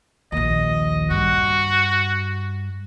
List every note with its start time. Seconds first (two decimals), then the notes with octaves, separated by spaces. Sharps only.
0.32 A#1 D#2 D#5
1.10 G2 F#4